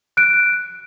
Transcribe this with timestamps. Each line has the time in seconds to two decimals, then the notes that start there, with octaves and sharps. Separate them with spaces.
0.17 F#6 D7